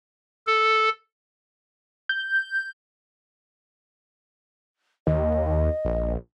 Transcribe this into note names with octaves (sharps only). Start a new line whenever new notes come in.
A4
G6
D#2 D#5
A#1